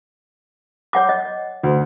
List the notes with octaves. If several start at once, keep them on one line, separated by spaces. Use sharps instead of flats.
C#5 F#5 D6
D#5
D2